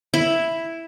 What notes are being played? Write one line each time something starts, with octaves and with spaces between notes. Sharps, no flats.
E4